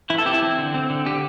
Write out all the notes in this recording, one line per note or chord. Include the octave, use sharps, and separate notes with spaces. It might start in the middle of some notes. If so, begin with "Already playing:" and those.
E3 E4
A4
C4 G4
E4
C4
D3
C4
D3
D3 G4